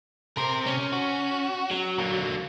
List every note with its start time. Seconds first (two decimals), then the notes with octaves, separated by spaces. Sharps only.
0.38 C3 C4 A#4
0.67 C#4
0.93 F#4
1.71 F#3
1.99 D3 A#3